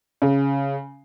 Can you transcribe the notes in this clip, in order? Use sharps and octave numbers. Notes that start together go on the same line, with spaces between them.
C#3